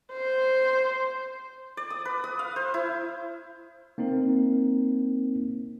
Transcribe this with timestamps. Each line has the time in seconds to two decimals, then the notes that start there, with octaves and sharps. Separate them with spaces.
0.13 C5
1.77 D5
1.90 D#6
2.05 B4
2.24 D#6
2.39 F5
2.56 C5
2.74 E4
3.98 A#3 C4 D#4 A#4